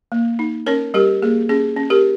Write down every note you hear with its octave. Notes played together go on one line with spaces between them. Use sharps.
A#3
D#4
C#4 A#4 C#5
G3 G4 A#4
A#3 G#4
C#4 G#4
C#4
G4 A#4